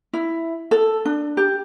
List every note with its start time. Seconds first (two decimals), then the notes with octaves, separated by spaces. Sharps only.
0.13 E4
0.71 A4
1.05 D4
1.37 G4